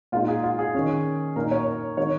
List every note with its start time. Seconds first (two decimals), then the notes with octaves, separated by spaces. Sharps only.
0.12 A#2 G#3 D#4 F4
0.28 G#4
0.43 F4
0.59 G#4
0.75 D#3 C#4
1.36 A#2 A#3 D#4 A#4
1.51 C#5
1.67 A#4
1.97 D#3 G#3 D#4 C#5